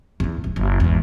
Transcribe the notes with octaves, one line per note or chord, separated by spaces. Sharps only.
E2 F4
D1
F#1
G#1 E2